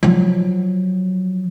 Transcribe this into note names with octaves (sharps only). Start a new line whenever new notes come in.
F3 F#3